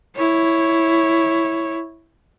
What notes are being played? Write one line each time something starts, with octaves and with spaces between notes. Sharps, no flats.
E4 C#5